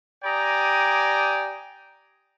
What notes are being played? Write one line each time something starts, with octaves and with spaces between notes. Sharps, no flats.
G4 D5 G5 G#5 A#5 D#6